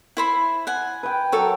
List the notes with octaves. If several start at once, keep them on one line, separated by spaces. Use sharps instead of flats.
E4 C5 B5
F#5 G#5
B4 G5
F#3 A4 A#4 C#5